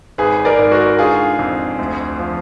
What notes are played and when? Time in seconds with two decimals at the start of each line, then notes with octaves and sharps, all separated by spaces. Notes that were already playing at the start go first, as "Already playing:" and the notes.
0.18 G#1 G#4 B4
0.45 A#4 D5
0.59 G#2
0.72 F#4 A#4
0.99 D3 F4 G#4
1.39 F2
1.79 D2
2.19 F3